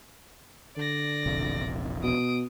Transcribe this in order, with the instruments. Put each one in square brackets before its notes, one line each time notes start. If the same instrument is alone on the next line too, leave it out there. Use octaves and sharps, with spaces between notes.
[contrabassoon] D3 [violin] D5 A#6
[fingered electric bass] E1 A#1 C3
[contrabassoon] B2 [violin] D#6 D7